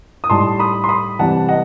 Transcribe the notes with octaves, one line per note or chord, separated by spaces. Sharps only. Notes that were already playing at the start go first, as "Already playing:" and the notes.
D#6
A2 G3 D#4 A5 C6
B5 D#6
C6
B5 D#6
C3 E3 G3 F#5 A5
D#5 F#5